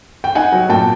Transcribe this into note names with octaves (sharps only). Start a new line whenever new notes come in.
G5
D#4 F#5 G#5
F#3
A#2 G5 A5